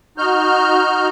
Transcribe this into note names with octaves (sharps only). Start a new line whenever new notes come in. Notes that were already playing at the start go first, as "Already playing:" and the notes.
D#4 F#4 F6 G6